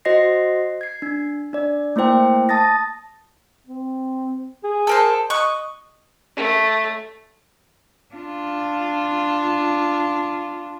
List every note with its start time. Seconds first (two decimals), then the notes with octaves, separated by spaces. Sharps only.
0.05 F#4 C5 D#5 A#6 C7
0.81 G#6 C7
1.02 D4
1.53 D4 D5
1.96 A3 A#3 E4 C5 G5
2.49 A5 D#6 A6 A#6
3.67 C4
4.64 G#4
4.87 A4 A#4 C5
5.30 D#5 C#6 F#6
6.36 A3
8.14 D4 F4